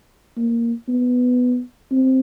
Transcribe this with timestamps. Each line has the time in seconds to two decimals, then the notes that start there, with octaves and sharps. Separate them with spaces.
0.37 A#3
0.88 B3
1.91 C4